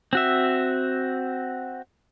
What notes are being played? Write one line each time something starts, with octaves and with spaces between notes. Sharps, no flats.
C4 F#4 E5